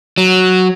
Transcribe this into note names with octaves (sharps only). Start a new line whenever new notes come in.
F#3